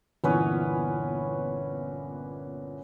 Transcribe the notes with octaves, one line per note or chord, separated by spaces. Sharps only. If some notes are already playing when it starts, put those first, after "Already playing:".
G1 A#2 E3 B3 C#4 B4